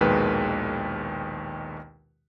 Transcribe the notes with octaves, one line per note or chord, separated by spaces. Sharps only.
A#1 D#2 B2 D#3 G#3 B4